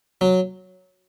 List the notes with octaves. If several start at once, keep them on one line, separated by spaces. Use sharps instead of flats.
F#3